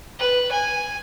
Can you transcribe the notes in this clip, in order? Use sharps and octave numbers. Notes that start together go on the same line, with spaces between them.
B4
G#5